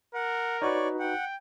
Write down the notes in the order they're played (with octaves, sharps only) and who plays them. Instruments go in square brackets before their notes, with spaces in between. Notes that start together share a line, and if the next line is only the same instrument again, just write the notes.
[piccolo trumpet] A#4 [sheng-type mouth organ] F#5
[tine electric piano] D#4 F#4 B4 [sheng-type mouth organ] C#5 D5
[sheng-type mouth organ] F#5 [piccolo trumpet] G5